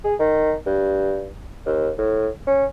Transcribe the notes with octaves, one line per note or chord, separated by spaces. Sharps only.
G#4
D#3
G2
D#2
A2
C#4